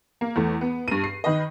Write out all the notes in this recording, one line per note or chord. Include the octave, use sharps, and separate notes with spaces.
A#3
E2 A3
B3
G2 D#7
C7
D#3 B4 D#5